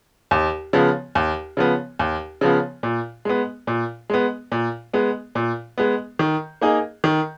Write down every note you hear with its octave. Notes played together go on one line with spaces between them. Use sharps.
D#2
C#3 F3 B3
D#2
C#3 F3 B3
D#2
C#3 F3 B3
A#2
G#3 B3
A#2
G#3 B3
A#2
G#3 B3
A#2
G#3 B3
D#3
A#3 D#4 G#4
D#3